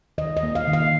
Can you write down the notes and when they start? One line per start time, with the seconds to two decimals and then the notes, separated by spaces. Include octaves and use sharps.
0.18 D#3 D#5
0.37 D#5
0.43 A#3
0.55 F5
0.68 D#3
0.73 F5